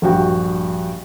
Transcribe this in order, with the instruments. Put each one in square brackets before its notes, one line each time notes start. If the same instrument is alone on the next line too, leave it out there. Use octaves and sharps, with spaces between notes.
[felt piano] A#1 G2 F#4 G5